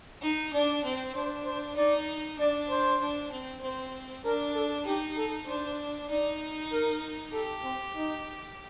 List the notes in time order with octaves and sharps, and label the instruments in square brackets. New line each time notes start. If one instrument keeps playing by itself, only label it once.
[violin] D#4
[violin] D4 [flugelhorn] D5
[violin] C4
[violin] D4 [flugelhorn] C5
[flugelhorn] C5
[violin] D#4 [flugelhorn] D5
[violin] D4 [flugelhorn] D5
[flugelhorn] C5
[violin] D4
C4
[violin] C4 [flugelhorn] C5
[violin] D4 [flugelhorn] A#4
[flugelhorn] A4
[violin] D#4 [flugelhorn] G4
[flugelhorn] A4
[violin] D4 [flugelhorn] C5
[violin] D#4 [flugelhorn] D5
[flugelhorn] A#4
[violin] G4 [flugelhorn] A4
[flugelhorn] C4
D#4